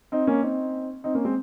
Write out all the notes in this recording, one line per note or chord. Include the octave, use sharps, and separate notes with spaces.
C4 D#4
A#3 C#4
C4 D#4
C4 D#4
A#3 C#4
G#3 C4